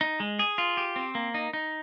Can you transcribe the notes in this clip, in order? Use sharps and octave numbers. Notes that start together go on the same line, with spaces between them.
D#4
G#3
G#4
F4
G4
C4
A#3
D#4
D#4